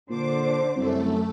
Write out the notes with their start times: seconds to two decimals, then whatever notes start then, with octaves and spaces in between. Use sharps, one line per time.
0.10 A#2 D3 D4 C5 D6
0.76 C2 F#2 A3 A4